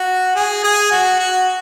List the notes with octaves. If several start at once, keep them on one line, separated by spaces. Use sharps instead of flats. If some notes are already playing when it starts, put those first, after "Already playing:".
Already playing: F#4
G#4
G#4
F#4
F#4